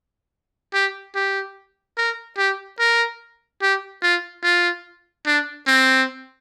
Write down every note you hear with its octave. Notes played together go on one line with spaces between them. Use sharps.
G4
G4
A#4
G4
A#4
G4
F4
F4
D4
C4